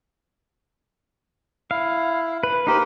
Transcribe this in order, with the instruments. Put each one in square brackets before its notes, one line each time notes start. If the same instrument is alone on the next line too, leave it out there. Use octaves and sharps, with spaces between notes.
[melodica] E4 [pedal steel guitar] F5
[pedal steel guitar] B4
[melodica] A#3 A#4 [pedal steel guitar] D#4 G4 C5